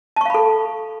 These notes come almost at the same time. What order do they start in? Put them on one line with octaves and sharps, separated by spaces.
A5 C#6 F5 B5 A4